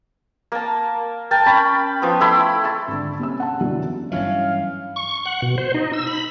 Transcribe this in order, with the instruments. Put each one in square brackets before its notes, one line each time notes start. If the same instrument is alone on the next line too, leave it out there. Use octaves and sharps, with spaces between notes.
[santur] A#3 A5
A#4 G5 A5
C#4 G5 B5
F3 B3
A3 E4 B5 C6
[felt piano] A5 B5 C#6 E6 A6
G#1 D3
C3 C#4 E6
F#5 A5
F#2 B2 D3 E3 F#3
[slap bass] G2 E3 F#3 [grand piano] C#4 E4 [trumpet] F5
[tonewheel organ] C#6
F#5
B2
C5
D#4
E6
B5